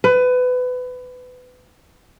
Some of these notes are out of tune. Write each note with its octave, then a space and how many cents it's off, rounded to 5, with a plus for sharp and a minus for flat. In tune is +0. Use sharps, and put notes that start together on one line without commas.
B4 +25